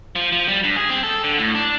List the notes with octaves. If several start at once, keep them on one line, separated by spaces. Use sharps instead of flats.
F3
F3
G3
G2
G#4
C4
A4
D3
A2
D4